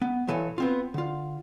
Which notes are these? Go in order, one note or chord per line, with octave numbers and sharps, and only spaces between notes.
B3
B1 A#2 E3 A4 C#5 G#5
B3 C4 F4
D3 F4